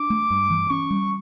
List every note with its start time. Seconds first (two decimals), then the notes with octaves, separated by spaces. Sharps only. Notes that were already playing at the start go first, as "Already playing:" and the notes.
Already playing: D4 D6
0.10 A3
0.30 G2
0.50 E3
0.70 C#4 C#6
0.90 G3